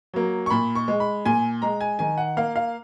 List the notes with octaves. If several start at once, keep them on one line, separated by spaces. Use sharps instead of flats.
F#3 A#3
C#6
A#2 B5
C#6
G#3
B5
A#2 G#5
G#3 A#5
G#5
D#3 G#5
F#5
A#3 F5
F5